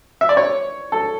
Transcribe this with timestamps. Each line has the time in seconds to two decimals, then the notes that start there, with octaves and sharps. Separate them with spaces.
0.21 E5
0.29 D5
0.37 C#5
0.92 A4